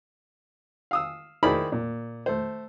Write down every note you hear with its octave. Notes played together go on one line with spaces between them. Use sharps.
F5 D#6 E6
D#3 E4 G#4 C5 D5 B5
A#2
A3 C5